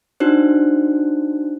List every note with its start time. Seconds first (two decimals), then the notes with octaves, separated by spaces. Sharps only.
0.20 D4 D#4 F#4 C5